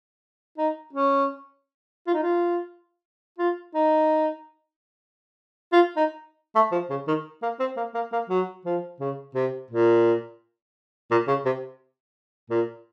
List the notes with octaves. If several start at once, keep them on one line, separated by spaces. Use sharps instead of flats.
D#4
C#4
F4
D#4
F4
F4
D#4
F4
D#4
A3
F3
C#3
D#3
A#3
C4
A#3
A#3
A#3
F#3
F3
C#3
C3
A#2
A#2
C#3
C3
A#2